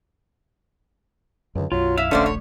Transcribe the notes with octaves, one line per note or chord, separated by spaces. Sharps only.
C#2 F#2 D3
B1 F#2 F#3 F4
E4 E5 F5
D#1 A#1 D3 A3 C#4 C5 D5
C#5